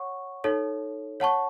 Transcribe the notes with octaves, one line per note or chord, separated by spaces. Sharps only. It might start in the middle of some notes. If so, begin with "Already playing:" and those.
Already playing: C#5 F#5 C#6
D#4 A4 C#5
C#5 F#5 A5 C#6